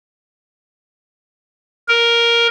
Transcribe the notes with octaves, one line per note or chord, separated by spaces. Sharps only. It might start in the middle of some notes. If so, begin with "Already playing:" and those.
A#4